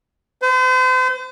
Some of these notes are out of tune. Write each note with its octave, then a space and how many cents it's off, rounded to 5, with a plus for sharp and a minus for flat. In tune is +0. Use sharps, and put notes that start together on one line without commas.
C5 -40